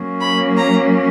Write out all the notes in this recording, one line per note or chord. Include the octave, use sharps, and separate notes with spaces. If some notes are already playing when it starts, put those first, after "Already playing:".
Already playing: F#3 A#3 C#4
B5
A#5